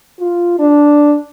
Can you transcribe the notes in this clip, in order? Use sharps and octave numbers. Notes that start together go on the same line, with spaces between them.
F4
D4